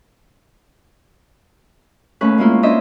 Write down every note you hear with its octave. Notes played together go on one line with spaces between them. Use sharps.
D#2 A3 C#4 B4 F#6
G#3 A#3 B3 E4 F4
C#4 D4 C5 D#5 E5